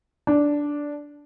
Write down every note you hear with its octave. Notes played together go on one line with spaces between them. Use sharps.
D4